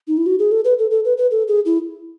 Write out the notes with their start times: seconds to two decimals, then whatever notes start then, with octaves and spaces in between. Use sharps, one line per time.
0.08 D#4
0.17 E4
0.26 F#4
0.39 G#4
0.51 A4
0.65 B4
0.79 A4
0.91 A4
1.05 B4
1.18 B4
1.31 A4
1.48 G#4
1.65 E4